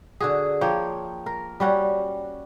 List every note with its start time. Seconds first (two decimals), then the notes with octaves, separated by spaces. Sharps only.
0.20 D3 F#4 G#4
0.61 F3 A#3 C#5 G5
1.26 A#4
1.60 G3 C#4 F#4